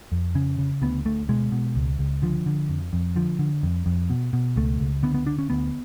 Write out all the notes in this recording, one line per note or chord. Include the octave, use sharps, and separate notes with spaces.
F2
C#3 C#4
C#3
D2 B3
D2 A3
B2 G#3
B2
C#2
C#2
D3 F3
D3
F2
F2
D3 F3
D3
F2
F2
B2
B2
C#2 A3
C#2
D3 B3
B3
D3 D4
C#4
D2 B3